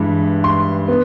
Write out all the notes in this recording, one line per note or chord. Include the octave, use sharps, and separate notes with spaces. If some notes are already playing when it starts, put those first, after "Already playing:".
Already playing: G2 E3 G#3
C6
B3